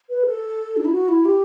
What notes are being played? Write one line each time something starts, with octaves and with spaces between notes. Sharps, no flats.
B4
A4
D4
E4
F#4
E4
G4